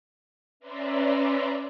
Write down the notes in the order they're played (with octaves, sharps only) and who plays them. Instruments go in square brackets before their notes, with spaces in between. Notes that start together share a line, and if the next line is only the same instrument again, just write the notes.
[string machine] C#4 B4 D5 E5 A#5 C6